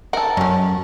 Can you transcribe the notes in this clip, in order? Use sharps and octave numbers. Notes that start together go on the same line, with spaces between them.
A4 A#4 F#5
F#2 F#3 C#4